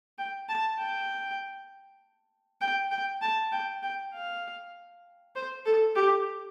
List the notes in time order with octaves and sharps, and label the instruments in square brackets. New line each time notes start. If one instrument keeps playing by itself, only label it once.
[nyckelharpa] G5
A5
G5
G5
G5
A5
G5
G5
F5
C5
A4
G4